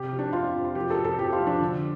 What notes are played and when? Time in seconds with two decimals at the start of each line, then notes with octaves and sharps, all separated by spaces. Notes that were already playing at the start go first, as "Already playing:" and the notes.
Already playing: C3 G4
0.12 F3
0.19 D4
0.33 F2 F4
0.55 F2
0.64 F4
0.75 F3 G4
0.90 A4
0.97 F2
1.04 A4
1.18 F2 G4
1.33 F4
1.40 F3
1.47 D4
1.61 D3